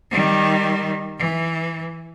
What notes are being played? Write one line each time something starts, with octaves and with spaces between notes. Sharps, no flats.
D#3 G3
E3